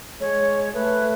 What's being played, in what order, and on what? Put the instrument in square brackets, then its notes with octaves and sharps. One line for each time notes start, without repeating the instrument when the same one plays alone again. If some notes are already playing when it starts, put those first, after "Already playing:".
[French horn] G#3 [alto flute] C#5
[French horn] A3 [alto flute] B4